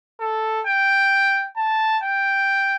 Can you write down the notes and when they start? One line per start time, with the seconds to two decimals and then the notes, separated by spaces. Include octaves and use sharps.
0.20 A4
0.66 G5
1.57 A5
2.03 G5